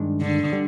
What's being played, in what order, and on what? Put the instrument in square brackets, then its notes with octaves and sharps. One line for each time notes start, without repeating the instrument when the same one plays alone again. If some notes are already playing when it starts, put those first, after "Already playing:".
Already playing: [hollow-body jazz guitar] G2 D#3 G#3 D4
[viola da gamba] D3
[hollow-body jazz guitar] D3 G3